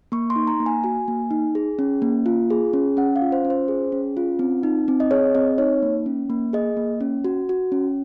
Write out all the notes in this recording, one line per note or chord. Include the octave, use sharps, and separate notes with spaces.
A#3 C#6
C6
D#4
A#5
A#3
G#5
F#4 G#5
A#3
D#4
G#4
C#4
A#3
F4
G#4
C#4
C#4 F#5
F5
F4
C5
C#4
C5
G#4
C#4
F4
C4
D#4
C4
D#5
G#4 C#5
C4 D#5
D#4 C#5
A#3
C#4
A#3
G#4 D#5
A#3
C#4
F#4
F#4
C#4